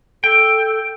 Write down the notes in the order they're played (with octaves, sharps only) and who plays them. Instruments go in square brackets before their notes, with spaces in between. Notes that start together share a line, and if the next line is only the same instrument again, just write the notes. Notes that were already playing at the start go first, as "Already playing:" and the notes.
[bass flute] A4 [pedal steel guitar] G5